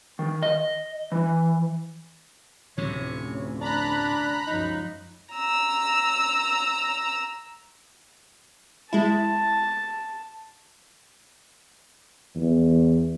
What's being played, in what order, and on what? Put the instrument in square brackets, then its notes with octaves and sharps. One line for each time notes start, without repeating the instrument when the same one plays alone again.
[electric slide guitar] D#3
D#5
E3
[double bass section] F1 D2 C#4 [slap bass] A2 C3 [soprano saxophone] C#5
[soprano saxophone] D4 [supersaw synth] A#5 B5 F#6
[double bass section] C#2 F#2 F3 [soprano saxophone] D#4
[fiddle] A#5 E6
[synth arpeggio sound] G#3 E4 [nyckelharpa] A5
[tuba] E2